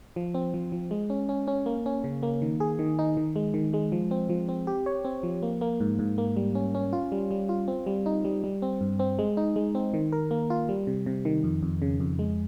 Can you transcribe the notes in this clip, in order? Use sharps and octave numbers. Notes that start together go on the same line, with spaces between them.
F3
C4
F3
F3
G#3
C#4
C#4
C#4
A#3
C#4
C#3
A#3
D#3
G#4
D#3
D#4
D#3
G#3
D#3
G#3
F3
C4
F3
C4
G4
C#5
C4
F3
A#3
A#3
G#2
G#2
A#3
G3
C#4
C#4
F4
G3
G3
F4
C4
G3
D#4
G3
G3
C4
G2
C4
G#3
D#4
G#3
C4
D#3
A#4
A#3
F4
G3
C3
C3
D#3
F2
F2
C#3
F2
G#3